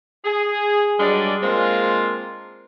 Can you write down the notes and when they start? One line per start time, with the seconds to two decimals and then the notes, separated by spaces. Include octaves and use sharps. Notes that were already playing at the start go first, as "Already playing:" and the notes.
0.25 G#4
1.00 G2 F#3 G#3 D5
1.43 G#3 A#3 C4 D4 F4